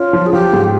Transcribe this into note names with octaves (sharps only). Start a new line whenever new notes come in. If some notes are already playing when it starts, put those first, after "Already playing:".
Already playing: C#4 F4
F3
G#4
F3 G4
G#2